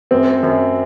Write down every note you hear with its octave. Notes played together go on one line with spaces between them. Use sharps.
F#2 C4
F#2